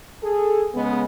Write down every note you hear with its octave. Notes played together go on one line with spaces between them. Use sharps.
G#4 A4
C#3 G#3 B3